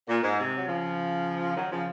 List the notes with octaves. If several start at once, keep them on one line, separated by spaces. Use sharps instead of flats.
A#2
G#2
C3
F#3
C#3 F3
D#3 F#3
C#3 F3